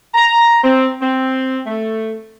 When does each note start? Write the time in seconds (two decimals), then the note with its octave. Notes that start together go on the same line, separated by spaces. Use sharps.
0.15 A#5
0.64 C4
1.01 C4
1.67 A3